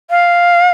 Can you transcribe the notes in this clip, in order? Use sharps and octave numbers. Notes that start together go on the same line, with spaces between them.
F5